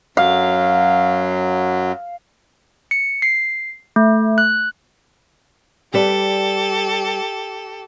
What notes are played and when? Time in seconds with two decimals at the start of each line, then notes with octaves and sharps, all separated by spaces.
0.17 F#2 F#3 F5
2.91 C#7
3.22 C7
3.96 A3
4.38 F#6
5.94 G3 G4 A4 B4 D5